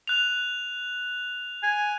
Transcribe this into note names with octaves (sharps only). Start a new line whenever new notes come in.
F#6 F7
G#5